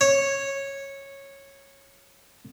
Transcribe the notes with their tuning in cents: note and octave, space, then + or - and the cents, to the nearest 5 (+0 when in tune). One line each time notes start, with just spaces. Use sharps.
C#5 -10